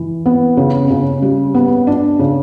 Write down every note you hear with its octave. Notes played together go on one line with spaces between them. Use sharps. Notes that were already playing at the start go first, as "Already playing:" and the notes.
Already playing: E3
B3
C#3
C#3
G3
B3
D4
C#3